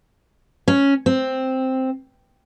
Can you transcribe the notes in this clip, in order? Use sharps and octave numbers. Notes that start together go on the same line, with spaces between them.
C#4
C4